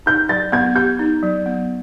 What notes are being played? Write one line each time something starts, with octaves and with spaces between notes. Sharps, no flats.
D#4 G6
F#3 A6
B3 G#6
G4 G6
D#4
F#3
B3